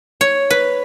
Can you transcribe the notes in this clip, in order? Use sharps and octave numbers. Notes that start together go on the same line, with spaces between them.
C#5
B4